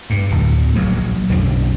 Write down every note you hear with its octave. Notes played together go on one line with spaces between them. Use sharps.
G2
D1 D2
A#1 F#3 A#3
B1 F#2 D3 D4